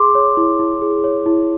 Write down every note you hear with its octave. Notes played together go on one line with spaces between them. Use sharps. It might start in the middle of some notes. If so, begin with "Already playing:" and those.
Already playing: G#4 C6 D6
C#5
E4
E4
G#4
C#5
E4